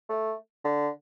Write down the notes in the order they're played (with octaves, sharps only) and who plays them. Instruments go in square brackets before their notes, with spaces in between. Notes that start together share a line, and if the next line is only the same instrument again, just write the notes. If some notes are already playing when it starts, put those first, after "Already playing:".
[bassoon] A3
D3